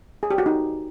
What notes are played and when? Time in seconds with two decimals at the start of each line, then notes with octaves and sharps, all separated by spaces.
0.23 G#4
0.31 G4
0.38 F#4
0.46 D#4